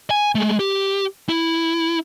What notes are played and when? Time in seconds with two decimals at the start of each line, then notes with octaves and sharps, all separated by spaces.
0.11 G#5
0.35 G#3 A3
0.59 G4
1.29 E4